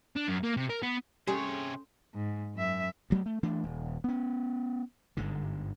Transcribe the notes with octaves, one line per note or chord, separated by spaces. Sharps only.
D4
F#2
A#3
C3
A#4
B3
C3 G3 C#4 G#4 C#5 C6
G#2
F#2 E5
G2 F#3 G#3 A3
A3
E3 A3 D4
D#1
B3 C#4
G1 G#2 D3